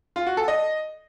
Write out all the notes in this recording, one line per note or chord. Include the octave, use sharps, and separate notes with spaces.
F4
F#4
A4
D#5